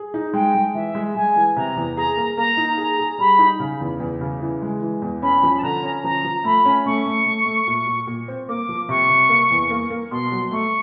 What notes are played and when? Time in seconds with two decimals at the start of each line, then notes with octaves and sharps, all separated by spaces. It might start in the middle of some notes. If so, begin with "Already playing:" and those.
Already playing: G#4
0.14 D#4
0.33 G#3 G5
0.55 G#3
0.74 E3 E5
0.95 G#3
1.15 G#3 G#5
1.36 E3
1.56 C3 A#5
1.76 E2
1.96 G#4 A#5
2.17 A#3
2.37 A#3 A#5
2.57 D#4
2.78 G#4 A#5
2.99 G#4
3.18 G3 B5
3.39 D#4
3.60 C#3
3.81 E2
4.00 E2
4.21 C#3
4.41 E3
4.62 G#3
4.82 E3
5.02 E2
5.22 C#4 B5
5.43 F3
5.57 A5
5.63 D3 A#5
5.83 C#4
6.04 F3 A#5
6.24 F3
6.44 A3 B5
6.65 C#4
6.86 A3 C#6
7.06 A3
7.26 A3
7.46 A3
7.67 A#2
7.87 A#2
8.07 A#2
8.28 C4
8.49 A#3 D6
8.69 F3
8.89 C3 C#6
9.10 C3
9.29 A#3
9.50 E2
9.70 A#3
9.90 A#3
10.11 B2 C6
10.32 F#3
10.52 A3 C#6